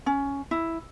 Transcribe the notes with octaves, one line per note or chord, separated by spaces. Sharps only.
C#4
E4